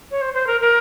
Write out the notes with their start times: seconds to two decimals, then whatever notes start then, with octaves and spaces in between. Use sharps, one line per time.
0.11 C#5
0.21 C5
0.34 C5
0.47 A#4
0.61 A#4